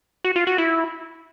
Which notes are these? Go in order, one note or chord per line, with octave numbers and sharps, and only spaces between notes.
F#4
F4
F#4
E4